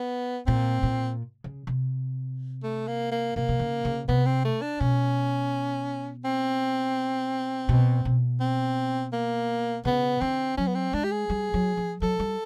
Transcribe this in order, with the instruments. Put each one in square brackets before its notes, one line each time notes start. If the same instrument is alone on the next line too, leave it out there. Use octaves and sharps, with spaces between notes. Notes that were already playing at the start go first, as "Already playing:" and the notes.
Already playing: [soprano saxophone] B3
[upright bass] A#2 [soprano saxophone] C4
[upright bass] A#2
C#3
C3
[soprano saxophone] A3
A#3
A#3
[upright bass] C3 [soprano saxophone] A#3
[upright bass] C3
C#3
C#3
[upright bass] C3 [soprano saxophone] B3
[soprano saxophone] C4
A3
D4
[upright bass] B2 [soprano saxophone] C#4
[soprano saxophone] C4
[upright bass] B2
B2
[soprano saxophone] C4
A#3
[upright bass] C#3 [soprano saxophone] B3
[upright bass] D3 [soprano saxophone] C4
[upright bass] F#3 [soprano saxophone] C#4
[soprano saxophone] B3
C4
[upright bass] G#3 [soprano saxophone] D4
[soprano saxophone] G4
G#4
[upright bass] G3
F#3
F3
[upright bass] F#3 [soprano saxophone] A4
[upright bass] G3